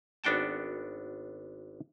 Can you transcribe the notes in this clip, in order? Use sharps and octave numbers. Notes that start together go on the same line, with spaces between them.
G#1 B3 D4 F#4 G5 A5